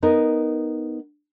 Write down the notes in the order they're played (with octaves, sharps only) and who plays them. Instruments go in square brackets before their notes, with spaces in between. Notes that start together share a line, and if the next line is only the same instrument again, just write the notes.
[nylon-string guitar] B3 D#4 A#4